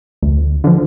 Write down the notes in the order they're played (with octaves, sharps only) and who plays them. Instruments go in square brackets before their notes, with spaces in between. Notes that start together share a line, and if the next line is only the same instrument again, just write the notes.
[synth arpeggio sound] D2
D3 F3